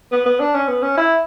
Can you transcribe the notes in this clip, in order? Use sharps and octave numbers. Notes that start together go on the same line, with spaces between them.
B3
B3
D4
C#4
B3
C#4
E4